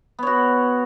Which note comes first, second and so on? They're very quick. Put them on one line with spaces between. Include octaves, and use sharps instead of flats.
B3 C#5 F#4